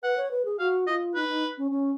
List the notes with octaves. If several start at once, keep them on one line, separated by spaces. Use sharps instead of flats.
B4 F#5
C#5
B4
G#4
F#4 F5
F4 D#5
D#4 B4
D#4
C#4
C#4